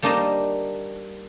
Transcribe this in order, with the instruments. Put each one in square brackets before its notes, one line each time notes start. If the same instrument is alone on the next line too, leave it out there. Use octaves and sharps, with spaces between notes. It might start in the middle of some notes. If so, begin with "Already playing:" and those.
[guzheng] G3 A#3 D4 D#4 C5 D#5